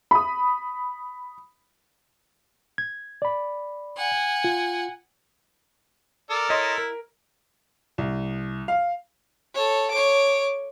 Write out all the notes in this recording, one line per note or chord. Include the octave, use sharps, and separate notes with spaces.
B5 D#6
G#6
D5 B5
F#5 G#5
F4
A4 A#4 D5
E4 C#5 D#5 C6
A#4
C2
F5
A4 C#5
C#5 D6